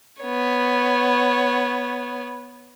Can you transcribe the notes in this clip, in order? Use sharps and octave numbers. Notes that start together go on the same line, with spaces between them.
B3 C#5